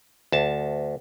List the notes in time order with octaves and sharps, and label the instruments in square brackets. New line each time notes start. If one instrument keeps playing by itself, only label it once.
[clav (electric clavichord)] D2 A5